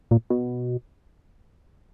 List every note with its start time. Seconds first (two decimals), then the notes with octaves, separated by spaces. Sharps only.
0.11 A#2
0.30 B2